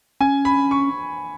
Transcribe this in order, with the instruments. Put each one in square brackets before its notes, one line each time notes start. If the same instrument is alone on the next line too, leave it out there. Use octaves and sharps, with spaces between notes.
[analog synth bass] C#4 [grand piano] G#5
[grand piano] B5
C#6